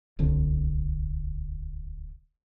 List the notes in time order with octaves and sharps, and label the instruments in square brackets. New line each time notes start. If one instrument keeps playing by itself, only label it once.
[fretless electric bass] D1 C2 D3